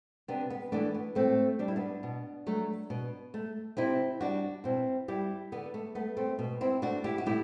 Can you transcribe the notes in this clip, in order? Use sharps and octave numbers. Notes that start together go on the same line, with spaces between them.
C3 B3 D4
B3
E3 A3 B3 D4
B3
A2 A3 C4
G3 D4
E4
B3 D4
B2
F#3 A3
B2
A3
C3 C4 E4
G3 D4 F#4
B2 C4 E4
G3 E4 G4
D3 B3
A3
A3 B3
A3 C4
B2
C4 E4
A3 D4 F#4
E4 G4
F#4
A2 E4 G4